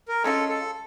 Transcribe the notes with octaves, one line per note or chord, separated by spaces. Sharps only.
A#4
G#3 C#4 F4 A4
A4